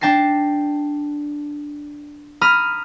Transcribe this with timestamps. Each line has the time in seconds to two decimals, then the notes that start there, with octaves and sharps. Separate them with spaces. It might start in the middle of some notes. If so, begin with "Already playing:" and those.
0.01 D4 G5 A5 A#6 C7
2.41 A#5 B5 D#6 F6